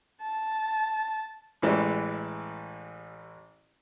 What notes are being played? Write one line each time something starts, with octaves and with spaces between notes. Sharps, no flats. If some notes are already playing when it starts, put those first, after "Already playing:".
A5
A1 E3 G3 G#3